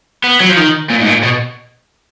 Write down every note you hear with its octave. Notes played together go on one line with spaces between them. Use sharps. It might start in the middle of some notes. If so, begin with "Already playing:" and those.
B3
F#3
F3
D#3
A#2
G#2
A#2
B2